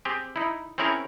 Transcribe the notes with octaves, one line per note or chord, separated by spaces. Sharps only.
C4 G4 G#4
D#4 E4
C4 C#4 E4 G#4 A#4 C#5